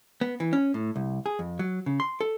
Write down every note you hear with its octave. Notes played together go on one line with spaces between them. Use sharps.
B3
E3
C#4
A2
C2
G#4
F2
F#3
C#3
C6
A4